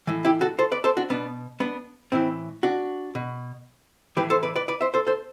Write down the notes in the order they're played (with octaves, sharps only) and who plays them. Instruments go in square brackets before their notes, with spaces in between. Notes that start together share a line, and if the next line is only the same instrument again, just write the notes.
[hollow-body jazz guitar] A2 E3
E4 G4
F#4 A4
A4 C5
B4 D5
A4 C5
D4 F#4
B2 B3 D4
B3 D4
A2 E3 C4 E4
D4 F#4
B2
A2 E3 G4 B4
A4 C5
B4 D5
B4 D5
B4 D5
C5 E5
A4 C5
A4 C5